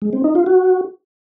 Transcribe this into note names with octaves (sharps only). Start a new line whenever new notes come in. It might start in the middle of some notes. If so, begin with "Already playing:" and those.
G#3
C4
D#4
F4
F#4